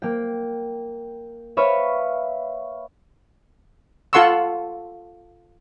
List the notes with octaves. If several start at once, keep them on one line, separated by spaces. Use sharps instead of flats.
A#3 G5
B4 C#5 E5 F5 B5
F4 A4 F#5 C6 C#6 E6